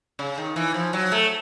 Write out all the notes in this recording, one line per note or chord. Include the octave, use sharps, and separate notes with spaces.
C#3
D#3
E3
F3
F#3
A3